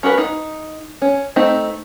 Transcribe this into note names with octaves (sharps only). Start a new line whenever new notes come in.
C#4 F#4 A#4 B4
D#4
C#4
A3 C4 D#4